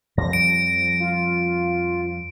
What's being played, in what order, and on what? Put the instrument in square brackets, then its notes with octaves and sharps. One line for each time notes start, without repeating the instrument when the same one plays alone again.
[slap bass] F2 F3 G3 [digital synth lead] A#6
[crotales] D7
[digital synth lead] F4